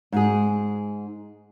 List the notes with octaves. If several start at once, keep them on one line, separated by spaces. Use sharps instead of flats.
G#2 G#4